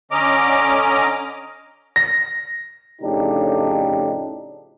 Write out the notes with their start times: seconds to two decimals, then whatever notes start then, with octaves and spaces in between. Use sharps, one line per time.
0.11 D3 C#4 D#5 A#5 D6
1.96 A#6
3.02 F2 A2 C#3 D4 D#4 G4